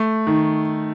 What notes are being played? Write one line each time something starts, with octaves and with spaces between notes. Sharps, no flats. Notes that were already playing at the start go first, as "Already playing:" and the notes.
Already playing: A3
D#3